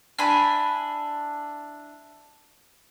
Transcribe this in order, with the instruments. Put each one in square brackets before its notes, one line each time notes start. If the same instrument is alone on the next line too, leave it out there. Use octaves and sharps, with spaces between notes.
[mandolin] D4 E4 G#5 B5